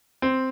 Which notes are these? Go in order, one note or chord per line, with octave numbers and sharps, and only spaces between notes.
C4